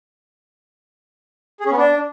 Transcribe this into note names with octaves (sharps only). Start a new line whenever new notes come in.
G#4
C#4
B3
D4